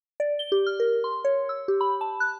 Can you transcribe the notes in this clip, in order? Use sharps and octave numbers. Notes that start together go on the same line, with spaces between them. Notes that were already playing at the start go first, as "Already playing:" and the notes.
D5
G7
G4
F6
A#4
C6
C#5
E6
G4
B5
A5
F#6